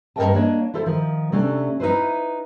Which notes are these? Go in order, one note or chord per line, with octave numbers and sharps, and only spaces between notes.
G2 B2 A#4 D#5 G5 A5
A#3 D4 C#5 D#5
E4 F4 A4 C5
D#3 F3
C3 A3 C#4 D4
D#4 E4 B4 C5